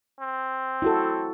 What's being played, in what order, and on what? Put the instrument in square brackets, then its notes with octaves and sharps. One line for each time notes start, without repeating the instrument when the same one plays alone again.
[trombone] C4
[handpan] E4 F#4 A4